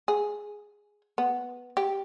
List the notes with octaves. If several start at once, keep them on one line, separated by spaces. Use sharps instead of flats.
G#4
B3
G4